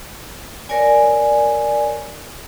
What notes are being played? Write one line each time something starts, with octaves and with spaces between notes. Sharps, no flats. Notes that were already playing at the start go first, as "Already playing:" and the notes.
A#4 C#5 D5 G#5